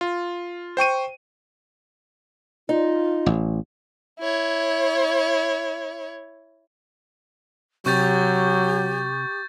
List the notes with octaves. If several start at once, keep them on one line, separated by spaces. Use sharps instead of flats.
F4
C5 G5 C#6 D#7
D#4 F4
A1
E4 C#5
C3 F#3 G4 C#6 G6 A6